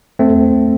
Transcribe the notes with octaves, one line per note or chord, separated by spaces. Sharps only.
A3 C4